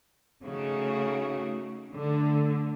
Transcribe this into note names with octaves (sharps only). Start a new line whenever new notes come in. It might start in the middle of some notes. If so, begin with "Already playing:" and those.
C#3 A3 D#4 F#4
D3 A3